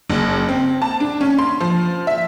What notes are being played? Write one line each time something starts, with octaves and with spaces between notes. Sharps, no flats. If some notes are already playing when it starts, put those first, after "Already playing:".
F#1
C4
A5
D4
C#4
C6
F3
E5